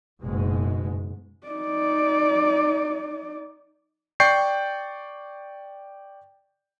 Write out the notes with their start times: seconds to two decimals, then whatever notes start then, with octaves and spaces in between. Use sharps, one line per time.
0.22 F#1 G#2 B2 G#3
1.47 D#4 D5
4.20 D5 G5 C#6 G6 C7